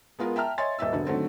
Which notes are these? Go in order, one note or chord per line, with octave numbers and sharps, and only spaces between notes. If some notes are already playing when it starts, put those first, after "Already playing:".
G#3 B3 F4 A#4
E5 G5 A5 A#5 F6
C#5 D#5 E5 G#5 C6 A6
D#1 D#5 E5 E6
E1 D3
D3 D#3 F#3 A3 C4